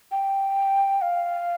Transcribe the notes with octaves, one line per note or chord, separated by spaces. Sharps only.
G5
F5